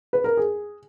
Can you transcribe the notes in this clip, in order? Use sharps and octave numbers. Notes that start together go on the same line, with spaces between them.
B4
A#4
G#4